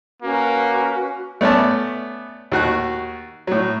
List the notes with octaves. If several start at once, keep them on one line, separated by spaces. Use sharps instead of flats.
A#3 C#4 F#4 B4
A3 B3 C#4 D5 A5
D#2 F#4 F#6
A2 F#3